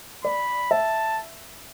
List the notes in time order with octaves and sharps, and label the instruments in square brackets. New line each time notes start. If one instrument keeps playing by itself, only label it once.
[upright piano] D5 [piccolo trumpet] B5
[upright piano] E5 [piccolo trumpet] A5